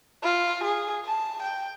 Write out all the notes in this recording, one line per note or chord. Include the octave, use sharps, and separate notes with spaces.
F4
G#4
A5
G5